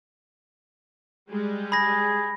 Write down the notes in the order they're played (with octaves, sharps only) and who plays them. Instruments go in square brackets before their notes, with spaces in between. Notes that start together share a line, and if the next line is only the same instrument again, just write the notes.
[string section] G3 G#3
[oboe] G#4 [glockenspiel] B5 A#6